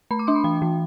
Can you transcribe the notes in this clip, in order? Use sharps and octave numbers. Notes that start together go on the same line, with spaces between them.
A3 B5
D6
D4 C6
B5
E3 G5
E3